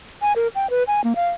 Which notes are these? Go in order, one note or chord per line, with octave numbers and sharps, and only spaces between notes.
G#5
A#4
G5
B4
G#5
A#3
F5